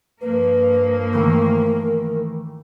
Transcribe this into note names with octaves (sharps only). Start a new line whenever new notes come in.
G2 F3 A#3 B4
D#3 E3 A3 A#4